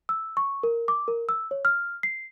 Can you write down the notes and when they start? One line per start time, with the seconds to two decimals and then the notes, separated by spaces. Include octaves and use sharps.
0.09 E6
0.37 C#6
0.63 A#4
0.88 D6
1.08 A#4
1.29 E6
1.51 C#5
1.65 F6
2.03 C7